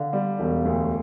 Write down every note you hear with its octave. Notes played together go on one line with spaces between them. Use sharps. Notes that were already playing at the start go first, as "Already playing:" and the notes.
Already playing: D3 F5
G3
E1
D2